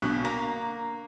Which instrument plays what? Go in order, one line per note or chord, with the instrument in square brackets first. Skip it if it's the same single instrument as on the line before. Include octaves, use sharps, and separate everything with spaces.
[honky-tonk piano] B1 B2 [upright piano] D3 C#6 F#6
[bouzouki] A#3 [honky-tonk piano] A#5